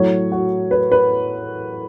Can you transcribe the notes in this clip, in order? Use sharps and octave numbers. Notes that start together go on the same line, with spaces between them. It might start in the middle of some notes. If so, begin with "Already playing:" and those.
Already playing: A2 F#3 A3 C#5
F#4
B4
B4